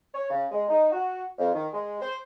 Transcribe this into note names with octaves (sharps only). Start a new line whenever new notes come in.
C#5
C#3
G#3
D#4
F#4
F2
D#3
G#3
C5